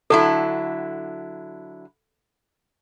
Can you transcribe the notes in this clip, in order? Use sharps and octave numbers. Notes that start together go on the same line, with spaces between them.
D3 F#3 E4 A4